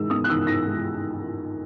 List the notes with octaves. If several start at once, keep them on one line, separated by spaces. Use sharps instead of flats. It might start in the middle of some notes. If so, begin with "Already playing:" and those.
Already playing: G#2 D#3 G#3 E6
B3 D#6
F#6
D#3 E6
G#2 A#6
G#3